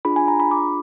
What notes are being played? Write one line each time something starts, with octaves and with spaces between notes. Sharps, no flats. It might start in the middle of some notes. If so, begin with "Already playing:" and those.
D4 F4 G#4 B5
G#5
A#5
B5
D6